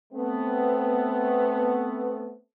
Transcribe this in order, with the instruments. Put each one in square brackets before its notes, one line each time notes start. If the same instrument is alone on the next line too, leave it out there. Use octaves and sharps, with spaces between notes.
[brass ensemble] A3 B3 C4